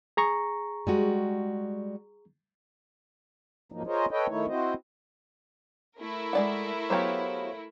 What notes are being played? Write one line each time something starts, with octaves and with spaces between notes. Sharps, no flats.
G#4 A#5 C#6
G3 G#3 F#4
G#2 F3 F#3 A#3 D#4
F4 G#4 A#4 C5 C#5 D#5
A4 B4 C#5 D#5 G5
D#3 A3 D#4 E4 C#5
C4 E4 F#4 C5 D#5
A3 E4 A#4
G#3 D5 F#5
F#3 B3 G4 C5 C#5 F5